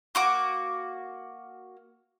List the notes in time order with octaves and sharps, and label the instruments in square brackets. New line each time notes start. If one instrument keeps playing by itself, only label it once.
[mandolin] A#3 F#4 D6